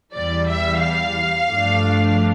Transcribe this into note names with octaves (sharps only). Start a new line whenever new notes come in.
E2 E3 G3 D5
E5
F5
G2 F3 A3 D4